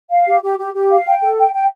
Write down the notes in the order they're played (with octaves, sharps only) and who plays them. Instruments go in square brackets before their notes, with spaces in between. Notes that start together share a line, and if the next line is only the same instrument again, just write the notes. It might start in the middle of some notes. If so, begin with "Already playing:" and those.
[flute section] F5
G4
G4
G4
G4
F5
G5
A4
G5
G5